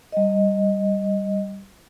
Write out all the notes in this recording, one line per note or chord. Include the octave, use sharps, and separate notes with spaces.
G3 D#5